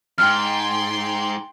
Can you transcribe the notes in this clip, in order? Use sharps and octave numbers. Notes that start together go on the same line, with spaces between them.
F2 G#2 G5 C6 F6